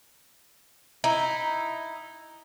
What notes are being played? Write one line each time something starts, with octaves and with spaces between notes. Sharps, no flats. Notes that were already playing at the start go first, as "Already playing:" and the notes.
D#4 E4